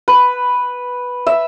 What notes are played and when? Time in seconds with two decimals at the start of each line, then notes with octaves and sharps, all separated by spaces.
0.08 B4
1.27 E5